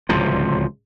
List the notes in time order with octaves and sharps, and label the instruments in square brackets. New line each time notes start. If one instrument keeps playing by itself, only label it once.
[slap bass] D1 C#2 C3 F3